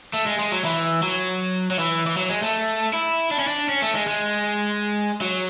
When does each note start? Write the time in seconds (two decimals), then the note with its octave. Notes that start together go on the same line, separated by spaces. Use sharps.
0.13 A3
0.26 G#3
0.39 G#3
0.52 F#3
0.65 E3
1.03 F#3
1.71 F#3
1.79 E3
2.07 E3
2.17 F#3
2.29 G#3
2.43 A3
2.93 E4
3.31 D4
3.39 C#4
3.47 D4
3.69 C#4
3.82 A3
3.95 G#3
4.07 G#3
5.21 F#3